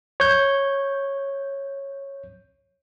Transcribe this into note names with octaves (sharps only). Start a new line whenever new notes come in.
C#5 G6